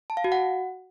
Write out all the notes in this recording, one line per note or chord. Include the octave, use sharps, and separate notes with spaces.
A5
F5
F#4
F#5